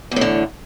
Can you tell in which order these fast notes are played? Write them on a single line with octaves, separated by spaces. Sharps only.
E2 A2 D3